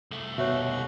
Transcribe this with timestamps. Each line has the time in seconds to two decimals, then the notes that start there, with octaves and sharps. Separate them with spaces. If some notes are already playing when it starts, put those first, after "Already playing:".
0.11 C2 A3
0.38 D#2 B2 F#4 C#5 E5